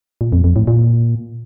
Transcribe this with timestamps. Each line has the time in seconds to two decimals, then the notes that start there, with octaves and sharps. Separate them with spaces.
0.21 A#2
0.32 F2
0.44 F2
0.56 A2
0.67 A#2